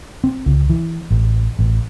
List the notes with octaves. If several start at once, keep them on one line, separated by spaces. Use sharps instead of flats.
C4
C#2
E3
A1
A1